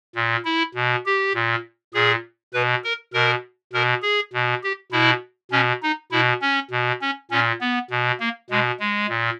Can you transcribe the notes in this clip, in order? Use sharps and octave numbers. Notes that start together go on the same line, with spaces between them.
A#2
E4
B2
G4
A#2
A#2 G#4
B2 B4
A#4
B2 A#4
B2 A#4
G#4
B2
G4
B2 E4
B2 C#4
D#4
B2 E4
C#4
B2
C#4
A#2 C#4
B3
B2
A#3
B2 G#3
G#3
A#2